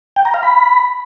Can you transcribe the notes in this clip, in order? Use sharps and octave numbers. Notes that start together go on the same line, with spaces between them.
G5
A#5
F5
B5